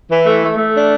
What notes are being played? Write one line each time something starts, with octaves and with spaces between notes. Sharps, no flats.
E3
A3
A3
A3
D4